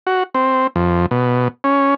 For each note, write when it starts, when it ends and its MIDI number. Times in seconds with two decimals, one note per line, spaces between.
0.07 0.23 66
0.34 0.67 60
0.76 1.06 41
1.11 1.48 47
1.64 1.94 61